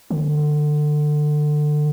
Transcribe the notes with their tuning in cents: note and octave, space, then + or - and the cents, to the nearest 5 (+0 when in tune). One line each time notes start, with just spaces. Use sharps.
D3 +25